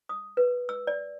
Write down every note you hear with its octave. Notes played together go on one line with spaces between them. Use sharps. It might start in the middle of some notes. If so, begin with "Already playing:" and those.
D#6
B4
E6
D5